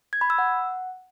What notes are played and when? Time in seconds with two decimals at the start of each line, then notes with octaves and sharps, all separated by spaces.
0.13 G#6
0.21 B5
0.30 E6
0.39 F#5